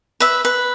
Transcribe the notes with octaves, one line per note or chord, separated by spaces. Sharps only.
B4 E5
B4